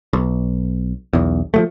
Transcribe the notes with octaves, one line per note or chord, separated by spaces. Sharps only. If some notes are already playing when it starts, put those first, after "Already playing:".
B1
B1 E2
F3 F#3 A3